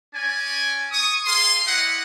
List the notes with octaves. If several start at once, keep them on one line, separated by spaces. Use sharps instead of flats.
C#4 D5 G#5
C#6 D#6
G#4 F5 C6
E4 G4 D#5 F#5